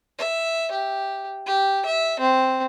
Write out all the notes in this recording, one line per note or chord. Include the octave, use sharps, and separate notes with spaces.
E5
G4
G4
E5
C4